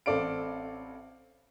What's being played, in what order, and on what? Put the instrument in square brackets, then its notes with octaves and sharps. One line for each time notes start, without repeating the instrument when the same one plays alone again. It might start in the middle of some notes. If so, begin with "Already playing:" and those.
[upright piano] A1 C4 A4 D5 F5 D7